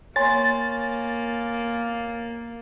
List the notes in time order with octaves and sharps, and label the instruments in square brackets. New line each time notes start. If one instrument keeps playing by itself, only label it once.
[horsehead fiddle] A#3 [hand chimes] C#5 G#5 C6 [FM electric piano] A6